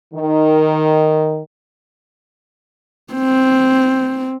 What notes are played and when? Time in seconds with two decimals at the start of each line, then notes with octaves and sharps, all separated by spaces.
0.14 D#3
3.13 C4